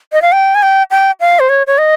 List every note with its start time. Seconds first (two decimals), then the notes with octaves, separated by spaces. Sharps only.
0.13 D#5
0.22 F5
0.32 G5
0.55 G#5
0.63 G5
0.91 G5
1.20 F5
1.40 C5
1.49 C#5
1.67 C#5
1.78 D#5